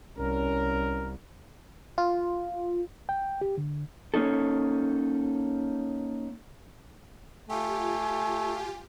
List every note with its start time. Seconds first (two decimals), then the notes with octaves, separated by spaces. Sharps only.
0.18 C2 C#4 A#4
1.98 F4
3.09 G5
3.41 G4
3.58 D3
4.14 A#3 C#4 D#4 A4
7.49 A3 F4 G4 G#5